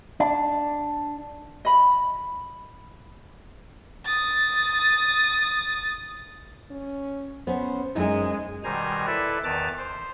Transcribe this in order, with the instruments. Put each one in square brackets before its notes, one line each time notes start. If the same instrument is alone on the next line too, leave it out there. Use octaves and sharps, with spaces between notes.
[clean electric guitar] D4
[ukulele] D#5 B5
[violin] D#6 A6
[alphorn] C#4
[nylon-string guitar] B3 C#4 [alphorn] C5
[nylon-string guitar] F#2 [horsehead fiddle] G#3 [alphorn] D#4
[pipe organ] B2 D#3 G3 C5 G#5 A#5
E4 A4 B4 D5 E5
E2 D#3 B4 A5 D6 F6
C5